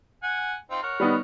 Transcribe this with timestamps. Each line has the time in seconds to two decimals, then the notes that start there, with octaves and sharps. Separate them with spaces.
0.23 F#5 G#5
0.71 C4 D#4 F4
0.83 A#4 C#5 F#5
1.00 G3 B3 D#4